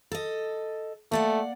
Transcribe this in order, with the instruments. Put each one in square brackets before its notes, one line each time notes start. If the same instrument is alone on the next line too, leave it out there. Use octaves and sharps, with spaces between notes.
[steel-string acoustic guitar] A4 D#5
[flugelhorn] A3 [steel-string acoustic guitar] A#3 D5 F#5